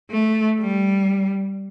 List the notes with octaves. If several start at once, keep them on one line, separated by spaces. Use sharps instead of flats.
A3
G3